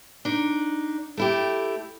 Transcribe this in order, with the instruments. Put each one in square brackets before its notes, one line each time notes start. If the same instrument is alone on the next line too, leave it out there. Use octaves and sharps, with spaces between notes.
[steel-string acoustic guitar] D4 D#4
A3 E4 G4